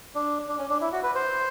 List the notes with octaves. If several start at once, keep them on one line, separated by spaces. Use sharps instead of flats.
D4
D4
C#4
D4
E4
F#4
B4
C5